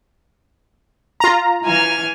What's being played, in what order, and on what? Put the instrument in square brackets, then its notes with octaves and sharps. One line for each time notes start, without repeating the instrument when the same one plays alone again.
[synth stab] F4 A#5
[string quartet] E3 G#5 F6